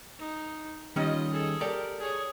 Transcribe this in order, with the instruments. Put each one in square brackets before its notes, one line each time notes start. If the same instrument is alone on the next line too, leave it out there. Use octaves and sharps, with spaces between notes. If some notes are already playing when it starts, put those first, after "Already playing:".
[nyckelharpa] D#4
[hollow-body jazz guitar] D#3 G3 C#4 [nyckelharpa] F4 D#5
[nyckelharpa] G#4 A4
[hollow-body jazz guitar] G4 A4 D5 [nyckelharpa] A#4
[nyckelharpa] G#4 C#5